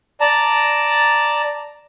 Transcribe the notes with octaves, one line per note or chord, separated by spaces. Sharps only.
D5 A5 A#5